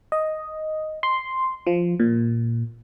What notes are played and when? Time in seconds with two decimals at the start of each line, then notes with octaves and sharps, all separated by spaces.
0.12 D#5
1.03 C6
1.67 F3
2.00 A#2